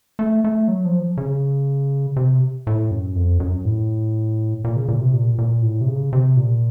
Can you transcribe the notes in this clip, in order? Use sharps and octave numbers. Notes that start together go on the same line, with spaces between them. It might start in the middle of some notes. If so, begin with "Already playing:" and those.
A3
A3
F#3
F3
C#3
C3
A2
F#2
F2
F#2
A2
A#2
C#3
A#2
C3
A#2
A#2
A2
C3
C#3
C3
A#2